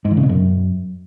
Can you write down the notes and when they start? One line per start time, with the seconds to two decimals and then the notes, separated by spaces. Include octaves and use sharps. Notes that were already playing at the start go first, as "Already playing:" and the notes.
0.05 G#2
0.11 E3
0.17 C#3
0.23 B2
0.29 F#2